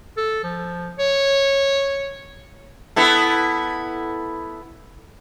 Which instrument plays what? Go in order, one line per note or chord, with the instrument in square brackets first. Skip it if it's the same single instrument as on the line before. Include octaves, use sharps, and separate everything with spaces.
[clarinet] A4
F3
C#5
[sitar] B3 E4 A4